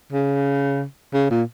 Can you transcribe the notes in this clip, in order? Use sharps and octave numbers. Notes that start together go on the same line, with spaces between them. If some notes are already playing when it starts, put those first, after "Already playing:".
C#3
C#3
A#2